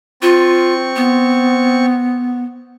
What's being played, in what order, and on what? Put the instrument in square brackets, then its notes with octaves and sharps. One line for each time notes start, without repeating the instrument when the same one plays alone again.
[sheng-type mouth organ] C4 C#6 [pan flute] F4
[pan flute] B3